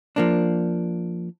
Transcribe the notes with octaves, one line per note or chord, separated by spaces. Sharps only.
F3 A#3 D4